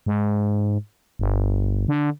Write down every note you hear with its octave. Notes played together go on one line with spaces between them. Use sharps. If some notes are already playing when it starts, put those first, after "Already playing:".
G#2
G1
D3